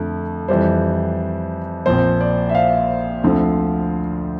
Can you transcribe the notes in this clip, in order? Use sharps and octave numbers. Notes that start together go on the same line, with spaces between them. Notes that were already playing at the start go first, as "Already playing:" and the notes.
Already playing: F2 D3 F3 A3
F2 E3 G3 C5
A#1 A#2 F3 C4 C5
D5
E5
F5
D2 D3 F3 C4